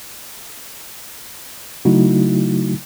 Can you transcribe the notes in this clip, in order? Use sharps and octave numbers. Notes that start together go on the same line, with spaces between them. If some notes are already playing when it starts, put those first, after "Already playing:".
C#3 F#3 A3 D#4 E4 F#4